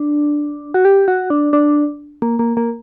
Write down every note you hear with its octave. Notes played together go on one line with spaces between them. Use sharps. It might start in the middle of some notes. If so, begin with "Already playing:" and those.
Already playing: D4
F#4
G4
F#4
D4
D4
A#3
A#3
A#3